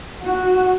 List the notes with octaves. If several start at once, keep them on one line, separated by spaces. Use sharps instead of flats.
F#4